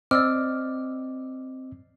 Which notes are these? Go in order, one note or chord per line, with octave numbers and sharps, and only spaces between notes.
C4 D5 D#5 D6 E6 F6